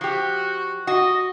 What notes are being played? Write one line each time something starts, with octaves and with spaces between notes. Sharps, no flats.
F3 F#4 G4
F#4 D#5